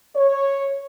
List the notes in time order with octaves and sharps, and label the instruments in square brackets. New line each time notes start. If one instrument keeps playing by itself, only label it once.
[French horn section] C#5